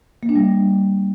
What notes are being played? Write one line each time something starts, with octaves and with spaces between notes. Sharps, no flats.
A#3
D4
G3